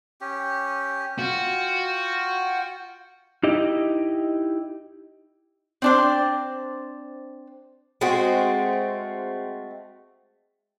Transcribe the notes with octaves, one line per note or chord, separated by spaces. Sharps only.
C#4 G4
F4 F#4 G5
D#4 E4 G4 D#5
C4 D4 C5
G#3 A3 C4 F#4